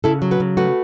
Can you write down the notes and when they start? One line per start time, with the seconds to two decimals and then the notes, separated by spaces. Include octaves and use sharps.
0.04 C#3 E4 A4
0.22 F#3
0.31 F#4 B4
0.40 C#3
0.57 A3 F#4 B4